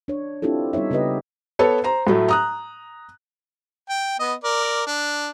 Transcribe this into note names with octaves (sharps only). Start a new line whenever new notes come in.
D4 C#5
C4 D4 E4 F4 G4 A4
G3 B3 D#4 C#5 E5
C#3 B3 E4 G4 B4 D#5
B3 A4 C#5
C5 A#5
A2 F#3 A3
A#5 D#6 F#6
G5
B3 D#5
A#4 D5
D4